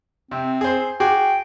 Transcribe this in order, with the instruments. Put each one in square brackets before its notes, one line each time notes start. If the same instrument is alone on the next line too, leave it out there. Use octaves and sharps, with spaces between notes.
[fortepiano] C3 [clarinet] C4
[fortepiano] G#4 C5
[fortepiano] F#4 G#4 D6 [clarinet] G5